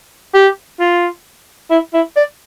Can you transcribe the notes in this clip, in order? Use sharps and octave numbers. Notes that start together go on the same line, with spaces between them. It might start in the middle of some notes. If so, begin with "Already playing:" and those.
G4
F4
E4
E4
D5